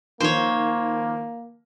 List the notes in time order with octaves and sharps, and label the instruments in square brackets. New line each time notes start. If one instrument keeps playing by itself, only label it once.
[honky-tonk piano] D#3 F3 [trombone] A#3 [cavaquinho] C5 C#5